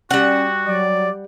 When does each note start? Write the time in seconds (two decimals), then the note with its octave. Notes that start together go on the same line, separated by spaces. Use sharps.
0.11 G3 C#4 F#4 F#5
0.67 F#3 D5